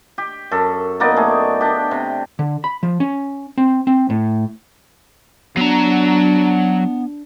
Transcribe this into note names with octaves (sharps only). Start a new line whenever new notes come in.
G4
F#2 A4
A#3 B3 D#4 D5
A3 G#4
D4 G4
C3
D3
B5
F3
C#4
C4
C4
A2
F#3 B3 D4 A#5